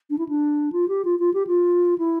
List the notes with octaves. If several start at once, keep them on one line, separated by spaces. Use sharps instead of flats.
D4
E4
D4
F4
G4
F4
F4
G4
F4
E4